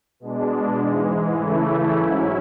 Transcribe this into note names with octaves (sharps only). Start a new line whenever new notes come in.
B2 G#3 D4
G#2 E3 G#3
C#3 E3 A3 E4
G#2 F#3 C#4 E4